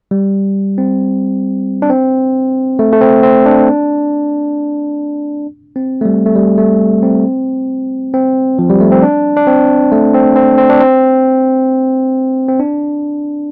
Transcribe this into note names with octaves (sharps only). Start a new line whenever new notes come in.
G3
C4
D4
C4
A3
A3
C4
C4
D4
C4
A3
G3
A3
G3
A3
C4
C4
F3
G3
A3
C4
D4
D4
C4
A3
C4
C4
C4
D4
C4
C4
D4